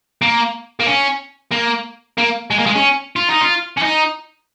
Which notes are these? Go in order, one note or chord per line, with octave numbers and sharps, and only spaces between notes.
A#3
A#3
C#4
A#3
A#3
G#3
A#3
G#3
C#4
F4
D#4
F4
C#4
D#4